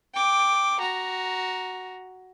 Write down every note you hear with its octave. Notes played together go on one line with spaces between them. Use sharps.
G5 D6
F#4 A#5